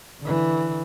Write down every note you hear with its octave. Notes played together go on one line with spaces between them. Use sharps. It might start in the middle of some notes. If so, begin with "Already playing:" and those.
D3 E3